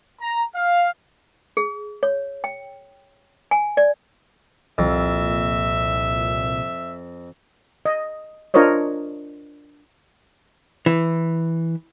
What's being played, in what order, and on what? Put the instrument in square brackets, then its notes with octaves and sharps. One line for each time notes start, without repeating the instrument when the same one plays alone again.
[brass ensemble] A#5
F5
[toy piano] G#4
C#5
G5
G#5
D5
[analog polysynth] C2 A#2 [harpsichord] F2 [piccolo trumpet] E5
[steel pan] D#5
D4 F4 A#4 C5 C#5 D#5
[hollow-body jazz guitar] E3